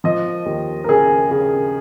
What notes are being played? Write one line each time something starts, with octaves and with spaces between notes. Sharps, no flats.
F3 D#5
D#2
A#4
C#3 G#4
C#3